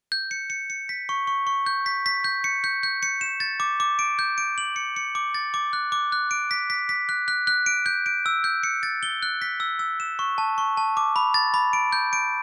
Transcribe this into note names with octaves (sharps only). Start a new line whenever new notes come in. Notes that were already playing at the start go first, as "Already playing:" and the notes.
G6
C#7
C#7
C#7
B6
C#6
C#6
C#6
G6
B6
B6
G6
C#7
G6
G6
C#7
E7
A6
D6
D6
D7
G6
D7
F#7
C#7
C#7
D6
A6
D6
F#6
D6
F#6
D7
B6
B6
B6
F#6
F#6
F#6
D7
G6
D7
E6
G6
C#7
A6
G7
F#6
B6
E6
E6
E7
C#6
A5
C#6
A5
D6
B5
A6
B5
D7
G6
D7